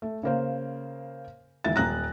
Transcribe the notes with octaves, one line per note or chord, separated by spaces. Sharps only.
A3
C#3 A#3 C5
E1 D#3 E4 A6
D#1 A#5 F#6 A#6